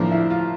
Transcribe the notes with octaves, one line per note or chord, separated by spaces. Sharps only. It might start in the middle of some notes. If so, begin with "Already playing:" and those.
Already playing: A2 F3 A#3 D4
E4
F4